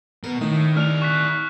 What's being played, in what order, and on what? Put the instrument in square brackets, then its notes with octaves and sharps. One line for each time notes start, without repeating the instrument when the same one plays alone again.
[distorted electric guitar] B2 [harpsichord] A#4
[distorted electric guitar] A2 [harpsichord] D#3
[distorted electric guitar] E4 D5 [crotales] F6 F7
[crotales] C#6 F#6 B6